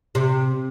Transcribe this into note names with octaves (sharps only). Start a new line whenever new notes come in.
C3